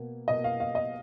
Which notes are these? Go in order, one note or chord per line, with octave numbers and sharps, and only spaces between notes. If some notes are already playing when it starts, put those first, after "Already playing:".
Already playing: B2 A#3
B2 A#3 D#5
F5
F5
D#5